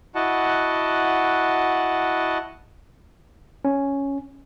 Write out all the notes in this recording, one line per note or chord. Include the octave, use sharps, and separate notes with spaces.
E4 F#4 D#5 F#5 A5
C#4